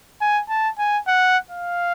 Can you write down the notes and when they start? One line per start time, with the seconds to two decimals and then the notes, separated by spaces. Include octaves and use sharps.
0.21 G#5
0.49 A5
0.78 G#5
1.07 F#5
1.51 F5